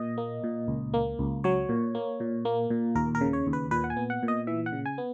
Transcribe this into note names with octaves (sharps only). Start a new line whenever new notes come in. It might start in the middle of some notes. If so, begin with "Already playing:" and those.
Already playing: A#2 D#5
A#3
A#2
C#2
A#3
C#2
F#3 C#5
A#2
A#3
A#2
A#3
A#2
D#2 A#4
A#4
C#3
C#5
D#2
B4
A#2 B4
F#5
G#5
B3
F#5
A#2
D#5
E3 E5
F#5
C#3
G#5
B3